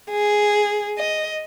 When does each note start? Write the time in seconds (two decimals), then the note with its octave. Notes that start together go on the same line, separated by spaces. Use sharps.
0.10 G#4
0.99 D#5